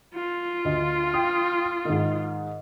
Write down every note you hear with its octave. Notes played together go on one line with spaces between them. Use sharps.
F4
D2 D#5
G5 D#6
G#2 D#3